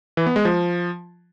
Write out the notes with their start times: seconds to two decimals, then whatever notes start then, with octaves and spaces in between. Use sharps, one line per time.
0.17 E3
0.26 B3
0.36 G#3
0.45 F3